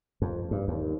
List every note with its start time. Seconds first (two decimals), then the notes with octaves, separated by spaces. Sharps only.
0.22 F2
0.51 G2
0.68 D#2